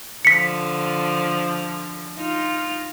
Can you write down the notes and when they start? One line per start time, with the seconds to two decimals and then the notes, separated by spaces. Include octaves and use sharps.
0.25 D3 F3 B6 C#7
2.15 D#4 F4